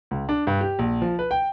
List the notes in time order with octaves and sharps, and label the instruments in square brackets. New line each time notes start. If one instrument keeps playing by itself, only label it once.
[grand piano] C#2
D4
G2
G4
A#1
F3
B4
G5